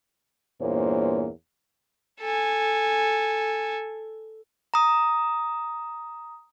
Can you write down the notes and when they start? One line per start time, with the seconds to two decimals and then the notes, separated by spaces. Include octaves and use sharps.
0.61 E2 G2 A#2 A#3 C5 C#5
2.21 A4 G#5
4.74 A#5 D#6